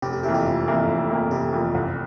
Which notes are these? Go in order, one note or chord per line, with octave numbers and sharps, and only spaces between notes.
F1 G4
G4
F2 E3 A#3 E4 G4
G4
F1 F4
F2 E3 A#3 E4
F1
F2 E3 A#3 E4
F1 G4
F2 E3 A#3 E4
C2